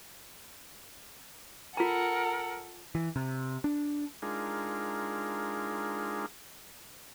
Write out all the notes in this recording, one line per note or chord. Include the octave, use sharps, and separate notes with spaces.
F4 A4 A#4 F#5 A#5
E3
C3
D4
G#3 D4 D#4 F4 G#4 A#4